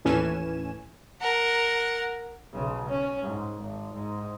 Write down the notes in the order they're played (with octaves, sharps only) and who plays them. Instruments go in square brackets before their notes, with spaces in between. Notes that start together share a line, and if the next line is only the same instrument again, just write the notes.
[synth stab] D#2 A2 E3 C#4 G#5 E7
[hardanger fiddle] A#4 F#5
[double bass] B1 C#3
C#4
G#2
G#1
G#2